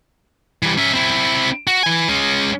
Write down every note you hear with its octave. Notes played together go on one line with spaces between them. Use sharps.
E3 G3
C#4 E5
C4 E4
F#4
E3 G#5
G#3 C#4